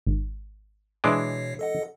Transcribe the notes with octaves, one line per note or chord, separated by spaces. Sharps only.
G#1
B2 E3 G#3 D4 C#5 C7
A4 D#5 F#5